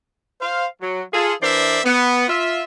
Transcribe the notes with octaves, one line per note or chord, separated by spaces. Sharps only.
C5 F5
F#3
F4 G#4 A4
E3 D4 A#4 C5 D5 E5
B3
F4 E5